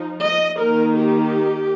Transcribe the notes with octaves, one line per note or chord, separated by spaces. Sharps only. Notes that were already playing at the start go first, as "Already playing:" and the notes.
Already playing: F3 D#4
D#5
D#3 A#3 D#4 A#4
G4